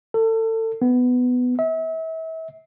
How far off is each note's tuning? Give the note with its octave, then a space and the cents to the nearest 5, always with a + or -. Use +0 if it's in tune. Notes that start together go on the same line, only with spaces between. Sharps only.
A4 +30
B3 +10
E5 -35